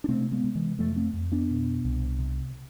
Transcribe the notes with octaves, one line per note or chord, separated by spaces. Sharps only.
D4
C3 A3 C4
G#3 B3
C3
E3 G#3
F2 F3 A3
A3 C4
F2
B3 D4
B2
C2
C3